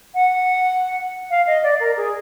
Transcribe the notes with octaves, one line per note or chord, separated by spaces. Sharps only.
F#5
F5
D#5
D5
A#4
G#4